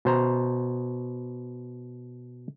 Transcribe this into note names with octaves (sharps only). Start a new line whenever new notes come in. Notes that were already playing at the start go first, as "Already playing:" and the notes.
B2 C5 A#5